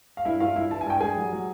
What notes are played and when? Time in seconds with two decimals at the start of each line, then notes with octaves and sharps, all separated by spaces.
0.17 F5
0.25 G2 E4 E5
0.40 G2 F4 F5
0.56 G2 E4 E5
0.71 E3 A5
0.81 G#5
0.86 G2 G5
1.01 G3 G#4 G#5
1.17 F#3
1.33 F#3